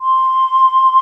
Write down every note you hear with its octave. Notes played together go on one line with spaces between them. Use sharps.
C6